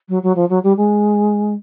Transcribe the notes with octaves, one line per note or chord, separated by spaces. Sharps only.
F#3
F#3
F3
F#3
G3
G#3